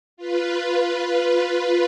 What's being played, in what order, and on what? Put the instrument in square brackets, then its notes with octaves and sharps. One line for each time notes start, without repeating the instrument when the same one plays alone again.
[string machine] F4 B4